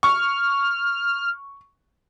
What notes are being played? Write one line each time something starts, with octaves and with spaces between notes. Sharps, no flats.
C#6 F6